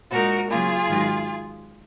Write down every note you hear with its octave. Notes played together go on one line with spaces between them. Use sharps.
A#2 G#3 D#4 F#4 A#4
C#3 F#3 A#3 F4 G#4
G#2 D#3 F#3